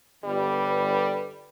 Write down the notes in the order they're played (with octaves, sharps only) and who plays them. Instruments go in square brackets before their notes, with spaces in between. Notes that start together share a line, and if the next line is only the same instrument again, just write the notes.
[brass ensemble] G1 B4 [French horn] G3